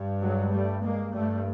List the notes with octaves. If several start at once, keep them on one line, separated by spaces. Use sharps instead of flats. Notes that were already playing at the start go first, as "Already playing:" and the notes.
Already playing: G2
F#3 G#3
G3 A3
G#3 A#3
G2 G3 A3